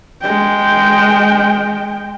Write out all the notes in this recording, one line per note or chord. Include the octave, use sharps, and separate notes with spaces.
G#3 G5